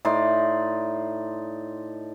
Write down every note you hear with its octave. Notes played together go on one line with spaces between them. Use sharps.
A2 D#4 D5 C6